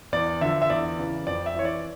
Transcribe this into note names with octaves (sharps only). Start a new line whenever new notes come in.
E2 D5
D3 F3 E5
E5
E2 D5
C#3 E3
F2 D5
E5
E3 C#5
D5